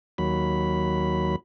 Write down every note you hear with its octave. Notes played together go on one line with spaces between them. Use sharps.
D#2 F#3 B5